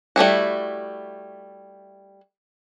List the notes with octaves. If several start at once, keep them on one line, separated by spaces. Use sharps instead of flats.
G3 A3 E4 F#4